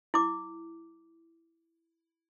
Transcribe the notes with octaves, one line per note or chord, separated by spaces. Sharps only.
E4 D6